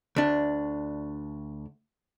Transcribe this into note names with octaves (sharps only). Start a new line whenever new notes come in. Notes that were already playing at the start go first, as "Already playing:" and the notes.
D2 D4